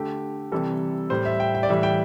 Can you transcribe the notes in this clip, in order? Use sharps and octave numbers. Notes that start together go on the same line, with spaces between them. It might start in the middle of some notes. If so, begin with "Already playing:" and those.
Already playing: D3 A3 G4
C3 E3 G3 A4
A2 G3 C5
E5
G5
G5
D5
A2 E3 G3 E5
G5